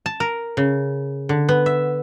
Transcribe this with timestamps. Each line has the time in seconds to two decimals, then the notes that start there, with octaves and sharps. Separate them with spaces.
0.06 A5
0.20 A#4
0.57 C#3
1.29 D3
1.49 B3
1.66 E5